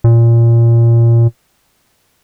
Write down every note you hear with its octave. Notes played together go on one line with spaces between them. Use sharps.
A#2